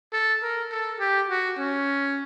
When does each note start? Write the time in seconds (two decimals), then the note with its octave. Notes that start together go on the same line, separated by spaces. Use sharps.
0.13 A4
0.43 A#4
0.71 A4
1.00 G4
1.29 F#4
1.58 C#4